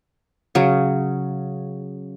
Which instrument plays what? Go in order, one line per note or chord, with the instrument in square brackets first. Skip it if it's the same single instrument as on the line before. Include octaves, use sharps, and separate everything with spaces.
[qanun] C#3 F#3